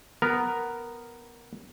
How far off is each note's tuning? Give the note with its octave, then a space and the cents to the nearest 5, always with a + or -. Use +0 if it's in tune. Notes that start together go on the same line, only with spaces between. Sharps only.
B3 +0 A#4 +0